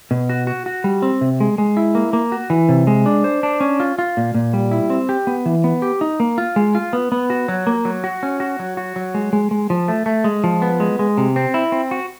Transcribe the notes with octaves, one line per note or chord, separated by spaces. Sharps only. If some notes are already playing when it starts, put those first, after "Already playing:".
B2
F#4
F#4
F#4
G3
C4
C3
G#3
G#3
E4
A#3
A#3
F#4
E3
C3
G#3
D4
C5
D4
C#4
F4
F4
A#2
A#2
G3
E4
C4
G4
B3
E3
B3
G4
D#4
A#3
F4
G#3
F4
B3
B3
F#4
F#3
A#3
F#3
F#4
C#4
F#4
F#3
F#4
F#3
G#3
G#3
G#3
F3
A3
A3
G#3
F3
B3
G#3
G#3
C3
C4
E4
C4
F#4